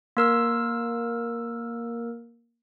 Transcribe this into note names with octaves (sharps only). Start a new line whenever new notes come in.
A#3 A#4 E6